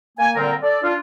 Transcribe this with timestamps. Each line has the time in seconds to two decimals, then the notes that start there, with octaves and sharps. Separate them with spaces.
0.18 A#3 G#5
0.36 A#2 D3 G3 C4 F4 A#4
0.63 A4 D5
0.82 D4 F4